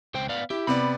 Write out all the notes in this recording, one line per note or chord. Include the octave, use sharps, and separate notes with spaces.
C#2 C5 G5
B3 D5 F5
E4 G4
C3 B3 D5 B5